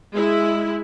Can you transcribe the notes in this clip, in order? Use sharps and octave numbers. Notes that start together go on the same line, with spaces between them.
G#3 E4